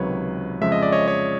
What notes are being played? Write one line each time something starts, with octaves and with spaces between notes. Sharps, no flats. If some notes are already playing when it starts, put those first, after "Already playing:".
Already playing: C#2 C3 D#3 F#3 B4 C#5
F2 C#3 F3 G#3 E5
D#5
D5
C#5 D#5
C#5 D#5